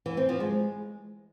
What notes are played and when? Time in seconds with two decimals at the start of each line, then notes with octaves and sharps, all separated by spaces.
0.06 E3
0.17 C4
0.29 F3
0.40 G#3